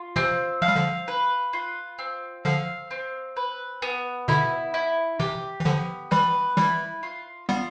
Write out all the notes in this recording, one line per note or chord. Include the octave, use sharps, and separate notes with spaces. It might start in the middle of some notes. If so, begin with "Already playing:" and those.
Already playing: F4
C3 E3 C4
F3 F5
G3
D3 F3
B4
F4
C4
D3 F3 F5
C4
B4
B3
B2 D3 E4
E4
C3 E3 G4
E3
D3 F3 B3
E3 G3 B4
E3 G3 E4
F4
G3 B3 F4